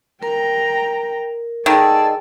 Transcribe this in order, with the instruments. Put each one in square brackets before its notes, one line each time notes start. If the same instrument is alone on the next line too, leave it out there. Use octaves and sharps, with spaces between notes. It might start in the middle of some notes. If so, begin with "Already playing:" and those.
[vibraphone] A#4 [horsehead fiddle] G5 A#5
[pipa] D#3 [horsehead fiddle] G#4 D5 [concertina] A4 A5 E6